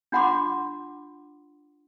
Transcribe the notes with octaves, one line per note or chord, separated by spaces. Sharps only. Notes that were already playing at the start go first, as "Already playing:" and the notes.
D4 F4 F#5 A#5 C6 D6